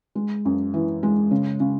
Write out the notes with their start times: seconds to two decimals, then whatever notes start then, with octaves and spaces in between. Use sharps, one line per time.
0.15 G#3
0.45 F#2
0.74 E3
1.03 G#3
1.31 C#3
1.60 C#3